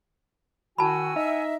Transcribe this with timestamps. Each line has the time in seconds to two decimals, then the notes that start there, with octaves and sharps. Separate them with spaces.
0.78 D#3 E4 F#4 F#5 G#5 A5 B5 E6
1.16 D#4 D#5 E5